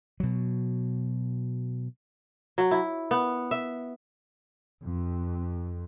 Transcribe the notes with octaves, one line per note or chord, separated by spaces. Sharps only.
B2 F#3
F#3
E4
B3
E5
F2